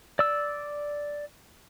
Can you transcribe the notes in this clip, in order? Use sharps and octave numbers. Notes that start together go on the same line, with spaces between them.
D5 E6